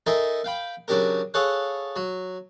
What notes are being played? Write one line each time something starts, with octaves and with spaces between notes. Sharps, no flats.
D#4 A4 A#4 E5 G#5 C6
F5 G5 B5
C#3 F#3 D4 G4 A#4
G#4 A4 C#5 F5 F#5
F#3